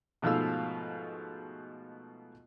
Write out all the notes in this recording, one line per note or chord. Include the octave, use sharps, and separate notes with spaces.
G#2 B2 F3 A3 F5 E6